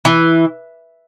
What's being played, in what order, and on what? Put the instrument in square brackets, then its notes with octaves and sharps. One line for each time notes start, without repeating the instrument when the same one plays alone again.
[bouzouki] E3